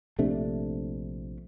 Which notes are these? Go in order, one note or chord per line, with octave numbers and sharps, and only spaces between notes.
A#1 C3 A3 D4